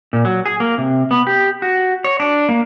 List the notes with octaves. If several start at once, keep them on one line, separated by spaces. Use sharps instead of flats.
A#2
F#3
G#4
A#3
C3
B3
G4
F#4
C#5
D4
A#3